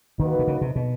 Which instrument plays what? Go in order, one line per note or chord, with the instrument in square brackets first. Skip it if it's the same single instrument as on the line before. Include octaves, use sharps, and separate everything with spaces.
[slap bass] D#3 [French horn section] A#3 D#4 F#4 B4
[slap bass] C3
C#3
C3
B2